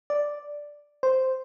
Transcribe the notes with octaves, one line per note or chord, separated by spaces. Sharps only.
D5
C5